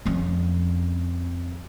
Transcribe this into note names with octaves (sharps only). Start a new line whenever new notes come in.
F2 C#4